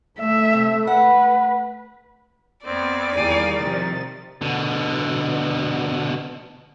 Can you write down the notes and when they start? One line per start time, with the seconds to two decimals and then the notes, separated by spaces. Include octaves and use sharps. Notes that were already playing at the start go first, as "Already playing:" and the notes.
0.20 A3 E5
0.53 C3
0.87 B4 F#5
2.65 F2 B3 C4 D5
3.16 E2 D#3 G3 D#4 F5 G5 G#5
3.60 C3 F3 A6
4.42 B2 D3